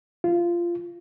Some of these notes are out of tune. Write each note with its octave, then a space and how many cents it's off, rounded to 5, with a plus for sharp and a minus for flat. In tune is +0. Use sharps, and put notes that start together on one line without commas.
F4 -20